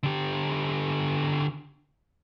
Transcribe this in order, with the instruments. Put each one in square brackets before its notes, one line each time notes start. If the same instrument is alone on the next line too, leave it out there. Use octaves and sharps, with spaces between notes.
[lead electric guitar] D3 G4